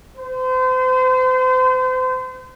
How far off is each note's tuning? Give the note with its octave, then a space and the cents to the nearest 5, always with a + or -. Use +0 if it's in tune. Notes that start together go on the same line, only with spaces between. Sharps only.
C5 -35